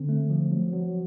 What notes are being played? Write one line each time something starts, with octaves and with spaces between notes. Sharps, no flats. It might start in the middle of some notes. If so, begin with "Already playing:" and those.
Already playing: D3 C4
A3
F3
F#3
F#3